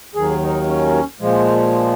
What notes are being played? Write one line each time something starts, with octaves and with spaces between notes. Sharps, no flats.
D#2 D#3 F#3 G#4
D#4
C#4
A#2 F3 G#3